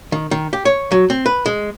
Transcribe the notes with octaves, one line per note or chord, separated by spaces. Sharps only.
D#3
D#3
G4
C#5
F#3
C4
B4
G#3